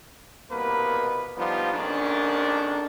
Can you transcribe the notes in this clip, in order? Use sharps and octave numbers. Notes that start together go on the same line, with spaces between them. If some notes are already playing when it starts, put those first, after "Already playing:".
C2 B2 A#3 B3 B4
F3 G3 B3 D4 D#4 F4
A#1 F2 D#3 C#4 D4